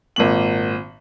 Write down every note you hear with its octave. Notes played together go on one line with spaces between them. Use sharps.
G#1 A#2 F#7